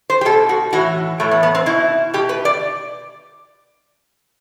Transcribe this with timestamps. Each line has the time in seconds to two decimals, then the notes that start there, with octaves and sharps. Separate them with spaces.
0.10 C5
0.21 G4
0.25 B2 A4
0.49 F#4
0.73 A2 E3 F#4
1.20 A2 E3 A3
1.31 B3
1.43 B3
1.55 C4
1.66 B2 E4
2.14 B2 G4
2.29 B4
2.45 D5